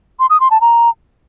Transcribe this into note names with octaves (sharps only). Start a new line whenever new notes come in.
C6
D#6
C6
A5
A#5